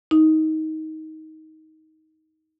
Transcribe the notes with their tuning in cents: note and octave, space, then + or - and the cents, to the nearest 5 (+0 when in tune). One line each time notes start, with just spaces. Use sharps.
D#4 +20